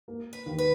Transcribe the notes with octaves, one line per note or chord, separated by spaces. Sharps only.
A#3
B4
D#2
B4